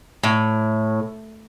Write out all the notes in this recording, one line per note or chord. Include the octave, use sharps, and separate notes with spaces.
A2